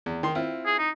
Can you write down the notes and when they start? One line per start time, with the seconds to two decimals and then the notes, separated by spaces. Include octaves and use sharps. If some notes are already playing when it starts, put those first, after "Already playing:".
0.06 E2
0.23 D#3 C6
0.35 C4 E4 F4
0.66 G#4
0.79 D#4